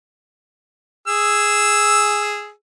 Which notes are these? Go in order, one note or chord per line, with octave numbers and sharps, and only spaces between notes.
G#4 E6